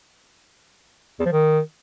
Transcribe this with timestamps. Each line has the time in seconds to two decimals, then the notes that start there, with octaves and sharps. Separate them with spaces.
1.20 E2
1.26 F3
1.32 D#3